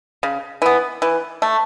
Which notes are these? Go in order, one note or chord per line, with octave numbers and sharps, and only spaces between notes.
C#3
E3 B3
E3
A3